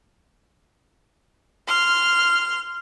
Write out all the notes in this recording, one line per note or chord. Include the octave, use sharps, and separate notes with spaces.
C6 F6